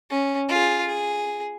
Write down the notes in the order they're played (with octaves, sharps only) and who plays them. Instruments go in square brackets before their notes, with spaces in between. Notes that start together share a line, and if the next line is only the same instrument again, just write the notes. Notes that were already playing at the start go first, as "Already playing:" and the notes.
[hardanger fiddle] C#4
F4 G#4
G#4